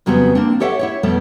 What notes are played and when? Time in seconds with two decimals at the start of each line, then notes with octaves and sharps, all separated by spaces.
0.06 F2 C#3 F#3 G3 B3 C4
0.35 A#3 C4 D4
0.60 G4 A4 C#5 E5 F#5
0.79 E4 G4 C#5
1.03 F2 B2 G3 A3 B3